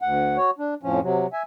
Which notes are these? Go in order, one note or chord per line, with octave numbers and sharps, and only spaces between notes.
D2 F#5
F#4 C#5
D4
F2 A2 F3 C#4
C3 F#3
E5 G#5